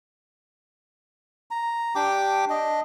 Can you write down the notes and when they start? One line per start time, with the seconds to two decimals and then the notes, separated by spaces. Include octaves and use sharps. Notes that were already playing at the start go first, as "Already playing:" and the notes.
1.51 A#5
1.95 D4 G4 G5 D6
2.50 D4 D#5